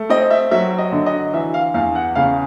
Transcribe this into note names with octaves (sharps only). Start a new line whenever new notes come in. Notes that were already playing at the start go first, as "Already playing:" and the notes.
Already playing: A3
C4 D#5
E5
F#3 E5
D#5
D3
D#5
E3 E5
F5
E2 F5
F#5
C#3 F5